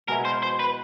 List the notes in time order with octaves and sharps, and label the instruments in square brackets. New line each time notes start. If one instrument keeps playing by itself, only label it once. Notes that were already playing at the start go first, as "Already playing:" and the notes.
[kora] B2 G#3 C#4 E4 [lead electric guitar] A#4
[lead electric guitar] C5
C5
B4